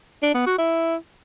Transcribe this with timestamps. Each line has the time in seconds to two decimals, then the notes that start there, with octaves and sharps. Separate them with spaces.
0.23 D4
0.34 B3
0.46 F#4
0.58 E4